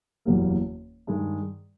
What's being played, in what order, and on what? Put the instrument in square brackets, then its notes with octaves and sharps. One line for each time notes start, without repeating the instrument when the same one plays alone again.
[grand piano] F#1 E2 B2 G3 A#3
G2 D#3 G#3